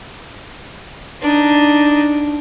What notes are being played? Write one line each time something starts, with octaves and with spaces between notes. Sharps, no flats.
D4 D#4